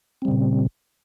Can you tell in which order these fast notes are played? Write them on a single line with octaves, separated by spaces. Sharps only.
C4 G3 C#3 A#2